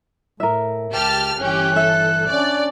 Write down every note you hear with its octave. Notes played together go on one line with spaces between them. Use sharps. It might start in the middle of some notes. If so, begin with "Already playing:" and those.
A2 A#4 E5
C#2 G4 A5 F6
G1 E3 C#4 G4 F#6
A4 E5
C#4 D4 D5